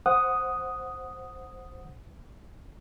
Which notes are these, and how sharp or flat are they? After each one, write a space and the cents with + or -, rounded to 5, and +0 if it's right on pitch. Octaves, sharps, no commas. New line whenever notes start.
C5 +5 F#5 +0 D#6 +0